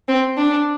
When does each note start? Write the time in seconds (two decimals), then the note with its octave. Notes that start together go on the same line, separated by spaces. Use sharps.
0.08 C4
0.37 D4